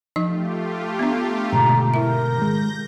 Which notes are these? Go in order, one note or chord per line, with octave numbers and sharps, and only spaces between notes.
F3 A3 D#4 F4 G4 D#5
B3 D4
G#2 B2 D3 A#5
E4 A#4 E5 G6 A#6
D#3 G#3